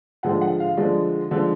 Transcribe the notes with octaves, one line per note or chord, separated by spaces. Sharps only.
D3 F3 G#3 F#5
F#5
F5
D3 F3 G#3 D5
D3 F3 G#3